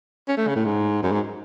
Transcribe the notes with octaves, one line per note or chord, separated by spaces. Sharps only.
C#4
A3
C#3
A2
G#2
F#2
G#2